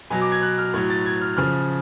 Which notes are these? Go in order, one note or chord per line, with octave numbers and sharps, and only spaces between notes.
B2 F#3 G#5
D6
G#6
F#6
F6
A2 F#3 G#6
A6
G#6
F6
C#3 F3 F6